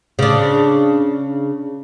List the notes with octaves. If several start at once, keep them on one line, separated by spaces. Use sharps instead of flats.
C#3 D4